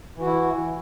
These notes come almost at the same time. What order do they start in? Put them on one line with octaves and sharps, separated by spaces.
E3 F#4 E4